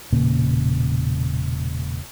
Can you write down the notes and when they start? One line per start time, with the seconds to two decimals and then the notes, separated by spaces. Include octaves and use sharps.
0.13 E1 A#2 C#3 A#3